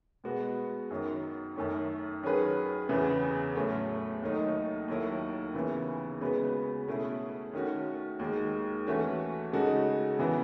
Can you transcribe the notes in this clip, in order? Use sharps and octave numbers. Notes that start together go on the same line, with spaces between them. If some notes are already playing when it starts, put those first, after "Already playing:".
B2 G#3 B3 F#4
F#2 D#3 F#3
F#2 D#3 A3 C#4
D#3 F#3 C#4 G#4 B4
E2 C#3 E3 B3
A2 F#3 A3 C#4
D#2 D#3 F#3 A3 D#4
D#2 D#3 F#3 A3 E4
D#2 C#3 E3 B3 E4
C#3 G#3 B3 F#4 B4
B2 A3 C#4 E4 G#4
D#3 A3 C#4 F#4
D#2 D#3 G#3
E3 A3 C#4 F#4
C#3 G#3 D#4 F#4 A4
C#3 E3 B3 E4